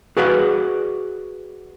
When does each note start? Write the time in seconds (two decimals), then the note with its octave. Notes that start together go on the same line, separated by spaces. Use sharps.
0.17 F#4 G#4 B4 D5 F5 F#5